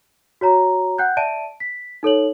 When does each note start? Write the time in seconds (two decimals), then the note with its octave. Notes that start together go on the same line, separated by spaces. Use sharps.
0.41 F#4 C#5 A#5
0.98 F#5 G5 F#6 G6
1.17 D5 E5 A5 D7 D#7
1.60 B6
2.03 D#4 A4 C#5 F#7